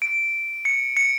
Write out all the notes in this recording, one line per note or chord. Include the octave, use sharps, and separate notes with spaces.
D7
C#7
C#7